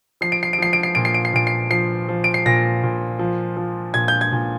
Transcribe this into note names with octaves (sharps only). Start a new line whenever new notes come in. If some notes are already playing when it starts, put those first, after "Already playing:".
F3 C7
D7
C7
D7
F3 C7
D7
C7
A#2 D7
C7
D7
C7
A#2 D7
C7
F3 C7
F3
D7
C7
A#2 A#6
A#2
F3
F3
A#2 G#6
G6
G#6
A#2